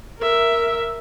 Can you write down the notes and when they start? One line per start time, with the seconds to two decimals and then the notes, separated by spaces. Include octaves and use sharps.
0.19 A#4 E5